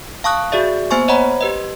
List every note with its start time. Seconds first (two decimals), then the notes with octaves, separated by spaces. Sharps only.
0.24 F5 A5 C#6 D#6 F#6
0.52 F#4 G#4 D5 E5
0.91 A#3 B3 C5 G#5 C#6
1.08 C5 C#5 D#5 F#5 A#5 B5
1.41 G4 B4 D#5